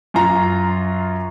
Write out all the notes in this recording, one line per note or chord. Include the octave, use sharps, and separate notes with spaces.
F#2 F4 A#5